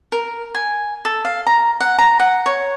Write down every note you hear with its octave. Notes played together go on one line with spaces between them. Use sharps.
A#4
G#5
A4
F5
A#5
F#5
A#5
F#5
C#5